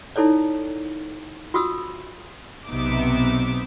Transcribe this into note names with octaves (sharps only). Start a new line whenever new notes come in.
D#4 E4 A4 C#5 D5
F4 F#4 D#6 E6
B1 C3 B3 D#4 E5 D6